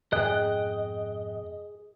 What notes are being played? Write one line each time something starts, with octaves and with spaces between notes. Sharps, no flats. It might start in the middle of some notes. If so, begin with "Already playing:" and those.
F2 G#2 B2 G#4 D#5 G5 F#6